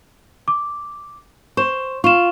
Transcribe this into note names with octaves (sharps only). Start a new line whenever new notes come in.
D6
C5 C#6 E7
F4 C#6 E7